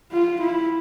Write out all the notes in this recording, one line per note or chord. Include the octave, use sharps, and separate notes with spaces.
F4
E4